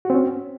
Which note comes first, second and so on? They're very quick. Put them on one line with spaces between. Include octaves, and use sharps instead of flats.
F#4 C4 C#4